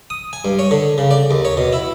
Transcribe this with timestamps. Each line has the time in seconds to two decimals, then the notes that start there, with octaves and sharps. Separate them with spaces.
0.10 D#6
0.33 G#5
0.45 G2
0.59 C#5
0.71 D3
0.98 C#3
1.11 D5
1.31 D#2
1.45 C#5
1.57 B2
1.73 E4